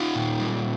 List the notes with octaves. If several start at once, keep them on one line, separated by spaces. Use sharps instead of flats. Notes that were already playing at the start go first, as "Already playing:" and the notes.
Already playing: D#4 F4
A#2
G3